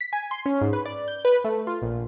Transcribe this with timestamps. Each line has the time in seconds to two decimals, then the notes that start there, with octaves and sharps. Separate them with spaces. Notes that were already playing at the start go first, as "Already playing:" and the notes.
0.01 B6
0.13 G#5
0.31 C6
0.46 C#4
0.61 G#2
0.73 B4
0.85 D5
1.08 G6
1.25 B4
1.44 A3
1.67 F4
1.82 A#1